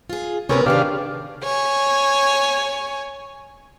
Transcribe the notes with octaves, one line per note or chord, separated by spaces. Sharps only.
F4 G#4
C3 B3 C#4 A#4 B4
C3 D#3 D4 G4 G#4 F5
C#5 G#5